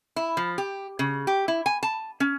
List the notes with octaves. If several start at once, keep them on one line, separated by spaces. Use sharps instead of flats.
E4
F3
G4
C#3
G4
E4
G#5
A5
C#4